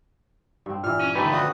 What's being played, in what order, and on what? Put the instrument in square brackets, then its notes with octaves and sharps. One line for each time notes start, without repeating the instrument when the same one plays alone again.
[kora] G2 C4
[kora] A#2 E3 [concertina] F6
[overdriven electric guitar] C#4
[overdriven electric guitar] D3 A3 [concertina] D#4 [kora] G4 E5 [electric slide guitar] B4
[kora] F3 [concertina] F#4 D#6